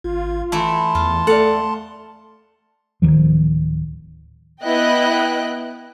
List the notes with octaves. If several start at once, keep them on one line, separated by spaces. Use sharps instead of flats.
G#1 F4
E3 A3 E4 A5 C6
E2 F4
A3 A4 D5 F5 F#5
D1 D2 D#3 F3
B3 E4 D#5 G5 F#6